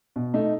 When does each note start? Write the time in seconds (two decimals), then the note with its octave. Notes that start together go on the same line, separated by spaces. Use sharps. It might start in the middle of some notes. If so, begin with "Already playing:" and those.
0.16 B2
0.34 A3 D#4